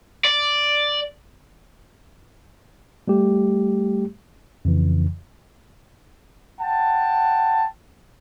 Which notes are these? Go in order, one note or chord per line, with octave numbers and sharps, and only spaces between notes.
D5
G3 A3 G4
F2 C#3 E3
F#5 G5 A5